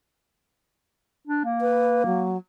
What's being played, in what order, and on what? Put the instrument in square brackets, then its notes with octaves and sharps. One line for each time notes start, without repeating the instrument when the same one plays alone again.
[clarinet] D4
A#3
[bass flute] B4
F#3